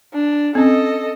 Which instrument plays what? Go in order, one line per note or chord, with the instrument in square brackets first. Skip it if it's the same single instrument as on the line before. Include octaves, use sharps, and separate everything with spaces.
[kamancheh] D4
[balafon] C4 C#4 [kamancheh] A4 D#5